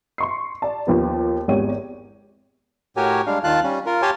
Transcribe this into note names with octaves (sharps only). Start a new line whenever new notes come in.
C6 C#6 C7
D5 A5
D#2 F3 B3
G#1 E2 G4 C#5 D#7
A2 F#4 G4 A#4 C#5 G#5
G3 G#3 D4 F5
D#2 D#3 F4 F5 A5 F#6
G3 C#4
F4 A#4
G4 C#5 F5 G#5 A5 C6